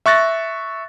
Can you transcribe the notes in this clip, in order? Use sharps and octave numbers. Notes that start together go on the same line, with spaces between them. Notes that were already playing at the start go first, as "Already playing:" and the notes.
E5 C#6 F#6 A6 A#6